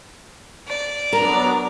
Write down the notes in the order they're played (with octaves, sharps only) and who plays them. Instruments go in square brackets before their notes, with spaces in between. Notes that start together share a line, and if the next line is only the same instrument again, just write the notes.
[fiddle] D5
[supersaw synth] F#3 B3 D4 [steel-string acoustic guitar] A#4 [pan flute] A#5